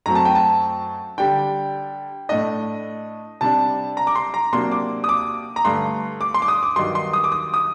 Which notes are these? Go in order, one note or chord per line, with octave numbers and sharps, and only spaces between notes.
F#2 F#3 A3 C4 A#5
A5
G5
A5
D3 G3 D4 G5
A2 A3 D4 D#5
C3 G3 D4 A5
A#5
D6
C6
A#5
C3 F#3 A#3 D4 C6
D6
D#6
D6
A#5
G2 D3 A3 C6
D6
C6
D6
D#6
D6
G2 D#3 F#3 C6
C6
D#6
D6
D#6
D#6